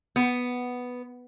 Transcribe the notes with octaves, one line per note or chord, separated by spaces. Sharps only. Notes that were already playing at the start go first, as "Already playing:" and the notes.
B3